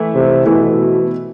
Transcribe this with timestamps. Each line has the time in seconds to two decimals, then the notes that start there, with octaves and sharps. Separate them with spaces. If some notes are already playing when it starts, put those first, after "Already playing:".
Already playing: E3 A3 E4
0.14 C3
0.45 B2 E3 A3 E4